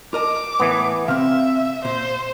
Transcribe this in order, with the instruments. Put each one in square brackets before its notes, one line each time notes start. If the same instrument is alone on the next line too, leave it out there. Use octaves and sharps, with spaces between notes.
[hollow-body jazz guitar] A#4 D#5 A5 [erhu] D6
[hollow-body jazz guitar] A2 [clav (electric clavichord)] E3 B3
[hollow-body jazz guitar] C3 C4 [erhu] E5 [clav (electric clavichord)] F5
[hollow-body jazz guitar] A#2 [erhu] C5